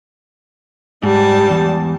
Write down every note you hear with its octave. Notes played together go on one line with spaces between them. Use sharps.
G#2 G3 A5
E2